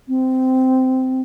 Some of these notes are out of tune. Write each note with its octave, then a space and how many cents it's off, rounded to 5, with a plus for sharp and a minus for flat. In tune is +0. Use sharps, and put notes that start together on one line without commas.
C4 -15